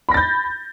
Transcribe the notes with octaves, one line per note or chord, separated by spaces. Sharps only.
B5 G6 A6 A#6